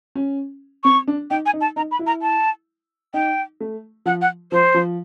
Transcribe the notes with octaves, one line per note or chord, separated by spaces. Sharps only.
C#4
C4 C#6
D4
D#4 G5
G#5
D#4
A5
D#4 A#5
B5
E4
A#5
A5
D#4 G5
A3
F3 F#5
F#5
F3 C5
F3